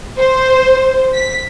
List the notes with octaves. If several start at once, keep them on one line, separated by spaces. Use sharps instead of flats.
C5
B6